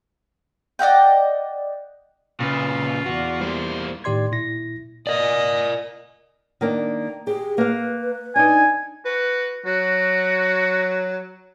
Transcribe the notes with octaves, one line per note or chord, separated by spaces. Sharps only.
D5 D#5 F#5 G5
A#2 C#3 F4 B4
E2 F#4 D5
G3 A#3 C5
A2 D#3 G4 D5 C6 G#6
A#2 E4 A#6
A#4 D5 D#5
D#3 A#3 D4
G4 G#4
A#3 B4 F5
D4 D#4 G#5
F#4 B4
F#3 F#4